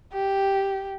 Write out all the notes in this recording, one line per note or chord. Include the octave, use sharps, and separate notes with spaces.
G4